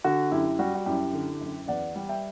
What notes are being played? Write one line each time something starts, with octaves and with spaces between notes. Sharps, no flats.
D3 F#4
F#2 E4 G4
G3 F#4
F#4
F#2 E4 G4
D3
F#2
E2 D5 F#5
G3
E5 G5